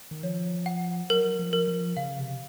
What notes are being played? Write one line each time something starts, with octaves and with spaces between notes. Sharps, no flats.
D#3
F3 C#5
F#5
F#3 A#4
F3
A#4
F3
C#3 F5
C3